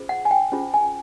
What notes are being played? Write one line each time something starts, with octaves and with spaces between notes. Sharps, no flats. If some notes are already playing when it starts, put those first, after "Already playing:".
Already playing: C#4 F4 G#4 C5
F#5
G#5
G5
C#4 F4 G#4 C5
G#5